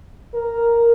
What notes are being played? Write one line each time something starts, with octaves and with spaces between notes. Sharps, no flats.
A#4